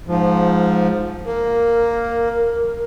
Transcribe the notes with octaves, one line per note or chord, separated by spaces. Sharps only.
G#2 F3
A#3 A#4